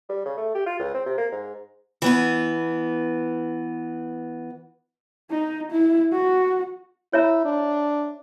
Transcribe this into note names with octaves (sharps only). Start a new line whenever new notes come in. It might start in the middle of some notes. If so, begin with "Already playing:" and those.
G3
C#3
A3
G4
F4
C#2
C4
C3
A#3
G#2
E3 B3 B4
D#4
E4
F#4
E4 C#5 E5 A#5
D4